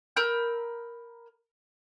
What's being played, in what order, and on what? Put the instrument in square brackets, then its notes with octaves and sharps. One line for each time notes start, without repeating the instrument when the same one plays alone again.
[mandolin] A#4 B5 E6 G6